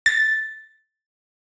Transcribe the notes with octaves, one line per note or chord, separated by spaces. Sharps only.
A6